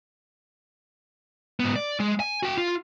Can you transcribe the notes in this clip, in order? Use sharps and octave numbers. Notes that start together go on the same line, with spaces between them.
G#2 B3
D5
G#3
G#5
F#4 G5
F4